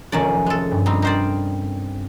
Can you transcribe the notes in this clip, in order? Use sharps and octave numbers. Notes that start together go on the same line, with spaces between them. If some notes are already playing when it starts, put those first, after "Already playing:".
F1 D#3 F#3 C#4 D5 G#5
G#3 A4
G2
G3 C4 D#4
C4 D#4 A#4 C5 D5